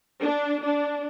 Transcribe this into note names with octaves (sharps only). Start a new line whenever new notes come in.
D4
D4